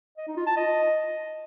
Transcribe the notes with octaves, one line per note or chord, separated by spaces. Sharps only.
D#5
D#4
F4
A5
D#5